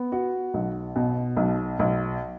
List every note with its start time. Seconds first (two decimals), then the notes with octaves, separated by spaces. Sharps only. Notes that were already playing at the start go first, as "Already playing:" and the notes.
Already playing: B3
0.12 F#4
0.54 B1
0.96 B2
1.37 B1
1.79 B1